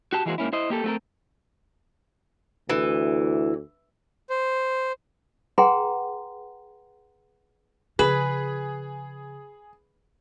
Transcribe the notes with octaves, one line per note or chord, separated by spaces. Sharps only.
F#4 G4 A5
E3 G#3 A#3 F#4 G#4 C5
G#2 A#3 C#4 E4
E4 C5 D#5
A#3 G4 A4
A3 C4 F#4 A4 A#4
D2 E3
C5
G#4 B4 F#5 G5 A#5 C6
C#3 F3 G#4 B4